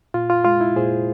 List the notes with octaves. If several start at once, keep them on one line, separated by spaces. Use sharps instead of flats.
A#2 F4
F4
G#3 F4
E4
A#2 G#4 C5